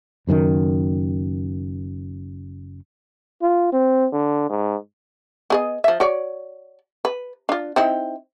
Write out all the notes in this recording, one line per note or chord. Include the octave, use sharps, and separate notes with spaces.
F#1 F#2 A#2 D#3
F4
C4
D3
G#2
B3 G#4 D#5
F3 E5
F#4 C#5 D5
B4
D4 F4
C4 D#4 E4